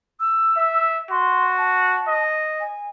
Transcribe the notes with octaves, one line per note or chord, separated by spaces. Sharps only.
E6
E5
F#4 C6
A5
D#5
G#5